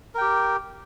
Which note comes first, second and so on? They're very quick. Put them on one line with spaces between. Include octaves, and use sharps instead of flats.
A#4 G5 G4